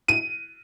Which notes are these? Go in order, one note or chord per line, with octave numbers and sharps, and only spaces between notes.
D#7